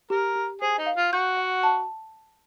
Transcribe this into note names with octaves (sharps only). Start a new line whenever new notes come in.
G4 A#4
G4
G#4 C5
D#4
F5
F4
F#4 G6
F#5
A5